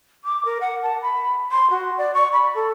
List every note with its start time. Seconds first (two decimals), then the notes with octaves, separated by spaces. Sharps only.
0.24 D6
0.45 A#4
0.61 F#5
0.83 A5
1.02 B5
1.51 C6
1.70 F#4
1.98 D5
2.14 C#6
2.33 B5
2.55 A4